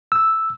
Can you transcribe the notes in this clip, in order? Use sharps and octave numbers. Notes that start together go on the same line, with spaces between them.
E6